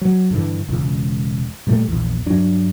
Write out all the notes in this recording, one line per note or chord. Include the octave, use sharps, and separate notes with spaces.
F#3
G2 D3 E3
E1 C#2
A#2 G3 A3
A#1 E2
G2 F#3 D4